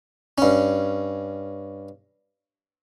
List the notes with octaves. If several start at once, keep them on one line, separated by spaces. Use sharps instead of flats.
G2 C#4